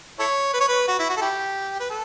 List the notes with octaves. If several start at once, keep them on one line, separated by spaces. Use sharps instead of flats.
E4 A4 C#5
B4
C#5
B4
F#4
E4
F#4
A4
E4 G4
B4
A4